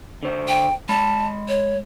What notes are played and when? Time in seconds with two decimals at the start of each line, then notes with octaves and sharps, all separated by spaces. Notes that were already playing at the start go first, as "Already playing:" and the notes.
0.23 D3 C5
0.48 G5
0.89 G#3 A5 B5
1.48 C#5